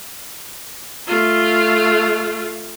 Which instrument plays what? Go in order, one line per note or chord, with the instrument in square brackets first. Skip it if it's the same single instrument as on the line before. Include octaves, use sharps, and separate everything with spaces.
[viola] A3 F4